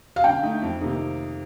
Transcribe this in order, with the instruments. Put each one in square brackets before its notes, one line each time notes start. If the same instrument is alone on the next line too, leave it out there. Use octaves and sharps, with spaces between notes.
[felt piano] F5
[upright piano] D3 [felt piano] G5
[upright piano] A3 D#4
F2
C3 D#3 A#3 D#4